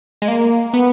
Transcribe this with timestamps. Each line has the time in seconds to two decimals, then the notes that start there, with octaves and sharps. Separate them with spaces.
0.22 G#3
0.28 A#3
0.73 B3